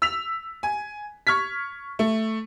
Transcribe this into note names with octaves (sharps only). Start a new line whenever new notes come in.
E6 B6 F7
G#5
C#6 F6 G#6 B6
A3